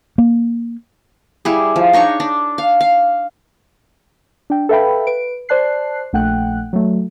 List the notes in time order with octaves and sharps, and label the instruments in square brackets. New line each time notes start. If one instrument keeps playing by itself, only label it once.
[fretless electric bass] A#3
[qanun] G3 E4 G#4
F3
D4 D#4 C#5 C#6
D4
F5
F5
[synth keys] D4 G5
A4 B4 E5 F5 G5 B5
B4 D7
C5 D5 A5 F#6 C7
A#1 A3 F#5 G5 F#6
F#3 A3